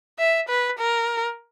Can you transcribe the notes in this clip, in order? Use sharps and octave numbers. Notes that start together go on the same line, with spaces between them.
E5
B4
A#4